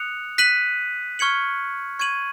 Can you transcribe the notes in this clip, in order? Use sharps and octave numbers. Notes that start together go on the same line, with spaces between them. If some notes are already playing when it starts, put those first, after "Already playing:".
Already playing: D#6 F#6 C#7 F7
F#6 B6 D#7 F#7
C#6 F6 G#6 C#7 F#7
C#6 G#6 D#7 F#7